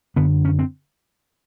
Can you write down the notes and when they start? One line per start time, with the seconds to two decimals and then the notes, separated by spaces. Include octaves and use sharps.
0.16 F#2 D3 B3
0.45 C#4
0.59 C4